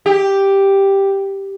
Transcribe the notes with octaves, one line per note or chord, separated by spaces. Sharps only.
G4